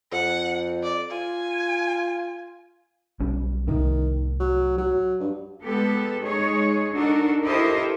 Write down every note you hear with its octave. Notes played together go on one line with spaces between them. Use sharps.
F2 F#5
D5
F4 G#5
B1 G3 C#4
C2 A2 D#3
F#3
F#3
G2
G#3 B3 G4 A4
G#3 D#4 G#4 C#5
D4 D#4 F#4 A4 A#4
E4 G4 A4 A#4 C5 D#5